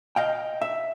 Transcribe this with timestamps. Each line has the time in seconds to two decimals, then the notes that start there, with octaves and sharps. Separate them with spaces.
0.16 D#5 F5 G5
0.62 E5